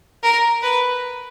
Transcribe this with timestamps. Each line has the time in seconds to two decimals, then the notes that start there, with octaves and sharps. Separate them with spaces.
0.23 A#4
0.63 B4